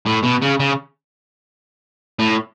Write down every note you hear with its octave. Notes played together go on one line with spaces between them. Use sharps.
A2
B2
C#3
C#3
A2